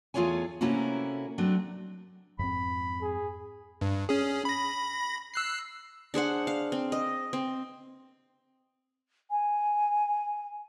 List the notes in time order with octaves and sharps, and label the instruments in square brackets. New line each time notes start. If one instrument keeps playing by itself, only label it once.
[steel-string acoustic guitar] E2 A3 F4 G#4 C#5 G#5
C3 A3 A#3 C#4 E4 F#4
F#3 A3 C4 D4
[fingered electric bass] F2 G#2 C4 [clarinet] B5
[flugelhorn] G#4
[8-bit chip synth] G2
C#4 G#4
B5 A#6
E6 F#6 C7
[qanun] D4 G#4 C5 F#5
F5
C4
D#5
C4
[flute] G#5